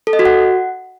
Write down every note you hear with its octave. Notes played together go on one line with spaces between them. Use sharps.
A4
D#5
F#4
F#5